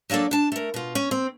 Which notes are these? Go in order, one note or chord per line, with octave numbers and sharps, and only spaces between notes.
F#3 A#3 D4 A4 D5
D4 A5
A3 A#4
B2 F4
C#4
C4